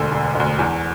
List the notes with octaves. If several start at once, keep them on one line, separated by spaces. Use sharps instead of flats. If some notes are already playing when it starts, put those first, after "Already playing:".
Already playing: E1 D2 D3 E6
E1
D2 D3
E2